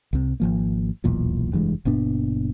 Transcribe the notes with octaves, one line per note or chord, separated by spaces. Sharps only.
C2 C3
G#1 F3 A#3
D#1 B1 E2 A#2
F1 G2 E3 G#3
F#1 A#2 B3 D4